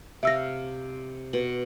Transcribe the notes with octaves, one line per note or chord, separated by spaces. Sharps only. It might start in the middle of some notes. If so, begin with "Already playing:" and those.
C3 E5 F5 E6 A#6
B2